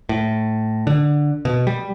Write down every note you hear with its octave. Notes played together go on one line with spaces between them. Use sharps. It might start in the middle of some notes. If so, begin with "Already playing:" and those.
A2
D3
B2
G3